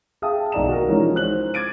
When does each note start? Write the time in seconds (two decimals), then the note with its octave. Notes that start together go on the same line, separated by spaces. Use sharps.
0.22 G#4 E5 F5 G5 A5 D#6
0.52 B1 D#3 D5 A#5 E7
0.68 F#4 A#4
0.88 E3 F3 G#3 C#4 D#4
1.15 C5 F#6 F#7
1.54 D6 G#6 A6 D7 D#7